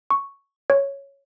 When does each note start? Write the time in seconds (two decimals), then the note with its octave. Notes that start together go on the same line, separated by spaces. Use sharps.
0.11 C#6
0.70 C#5